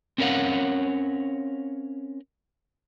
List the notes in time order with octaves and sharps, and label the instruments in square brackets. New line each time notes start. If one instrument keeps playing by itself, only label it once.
[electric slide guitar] C4 C#4 A#4 C#5 F5 F#5